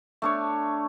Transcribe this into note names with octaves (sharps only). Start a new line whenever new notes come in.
A3 D4 C#5